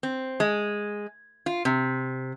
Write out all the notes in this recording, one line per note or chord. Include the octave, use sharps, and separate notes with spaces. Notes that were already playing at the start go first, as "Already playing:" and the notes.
C4
G#3
F4
C3